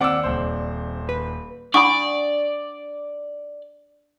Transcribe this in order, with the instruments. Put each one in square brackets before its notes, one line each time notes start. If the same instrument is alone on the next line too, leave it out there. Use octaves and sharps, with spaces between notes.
[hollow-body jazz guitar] D#2 C4 D5 [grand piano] F#5 D6 E6
[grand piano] D#1 C5
[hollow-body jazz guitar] B4
[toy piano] D4 F#5 D#6 [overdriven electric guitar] D5 [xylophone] B5 C#6